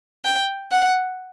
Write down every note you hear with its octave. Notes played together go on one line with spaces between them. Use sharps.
G5
F#5